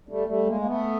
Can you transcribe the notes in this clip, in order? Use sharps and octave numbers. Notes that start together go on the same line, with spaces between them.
G3 A3
G3 A3
G#3 A#3
A#3
A3 B3